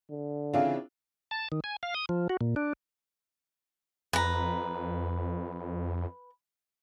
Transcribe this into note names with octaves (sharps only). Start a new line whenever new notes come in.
D3
C#3 E3 C4 D4 F4 F5
A5
D#3
G#5
F5
D#6
F3
F#4
A#2
D4
F2 B4 A#5